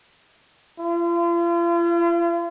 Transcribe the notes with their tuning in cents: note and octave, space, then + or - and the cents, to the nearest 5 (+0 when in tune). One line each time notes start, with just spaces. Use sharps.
F4 -40